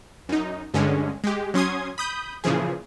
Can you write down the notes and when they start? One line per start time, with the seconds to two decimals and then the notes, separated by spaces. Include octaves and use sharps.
0.29 F#2 D#4
0.74 G2 D3 G#3 C#4
1.24 G#3 G4
1.54 F#3 C#4 C6 D#6 G#6
1.98 B5 D#6 G6
2.44 A#2 C#3 E3 F3 G#4